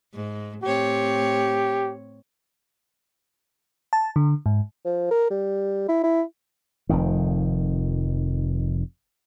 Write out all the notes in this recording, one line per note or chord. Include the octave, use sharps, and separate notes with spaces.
G#2
A2 C4 G4 C#5
A5
D3
G#2
F3
A#4
G3
E4
E4
F1 F2 D#3